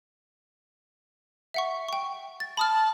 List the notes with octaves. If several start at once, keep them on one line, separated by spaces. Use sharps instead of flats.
E5 F#5 C#6
G5 C#6
A6
A5 B5 D#6 F6